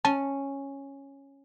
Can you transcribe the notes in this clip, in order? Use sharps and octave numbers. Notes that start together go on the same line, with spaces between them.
C#4 A5